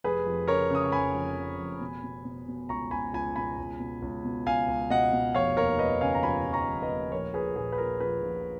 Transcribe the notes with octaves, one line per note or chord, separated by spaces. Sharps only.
F1 G#4 B4
F2
C#3 A#4 C#5
C#3 D#6
C#6
F1 G#5 B5
F2
C#3
F1
B2
B2
B2
B2
C#2 A#5 C#6
C#2 G#5 B5
C#2 G#5 B5
B2 G#5 B5
C#2
B2
C#2
B2
C#2 F5 G#5
C#2
B2 D#5 F#5
B2
F1 C#5 F5
D#2 A#4 C#5
F1 B4 D#5
C#3 F5 G#5
A#5
F3 G#5 B5
F3
A#5 C#6
F1
B4 D#5
D#2
A#1 A#4 C#5
A#2 G#4 B4
A#1 G#4
B4
A#2 A#4
F3 G#4 B4
A#1